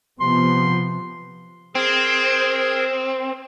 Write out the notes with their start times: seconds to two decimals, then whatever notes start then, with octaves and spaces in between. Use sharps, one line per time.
0.20 C3 F3 B3 C6
1.75 C4 G#4 A#4 G#6